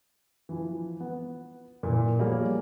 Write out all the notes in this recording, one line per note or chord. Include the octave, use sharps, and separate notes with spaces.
E3 F3
B3
A#2 E3
F3 G3 A#3 B3 G#4 C#5